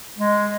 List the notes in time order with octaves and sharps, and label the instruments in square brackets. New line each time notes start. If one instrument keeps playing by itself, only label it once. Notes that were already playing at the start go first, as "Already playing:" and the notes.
[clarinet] G#3